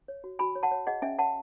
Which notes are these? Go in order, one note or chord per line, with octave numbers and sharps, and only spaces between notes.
C#5
F#4
F#4 G#5 B5
C#5
F#5 A5
C#5
G#4 D#5 F#5
C#4 E5 G#5
C#5 F#5 A5